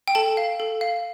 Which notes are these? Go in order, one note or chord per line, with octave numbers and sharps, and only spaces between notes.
G5
A4 A5
F5
A4
F5